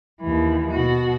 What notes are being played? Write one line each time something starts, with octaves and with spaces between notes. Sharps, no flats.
D#2 E3
B2 F#4